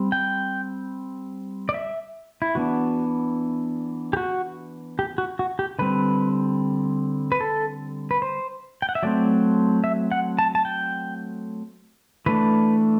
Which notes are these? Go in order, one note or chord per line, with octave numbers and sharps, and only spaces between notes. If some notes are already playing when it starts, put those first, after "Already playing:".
Already playing: G3 C4
G5
D5
E5
E4
E3 B3 D4 F#4
G4
F#4
G4
F#4
F#4
G4
D3 G3 C4 B4
B4
A4
B4
C5
G5
F#5
E5
F#3 A3 C4 D5
E5
F#5
A5
A5
G5
E3 A3 D4 B4